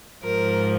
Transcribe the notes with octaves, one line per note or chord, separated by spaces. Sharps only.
G#2 F3 A#4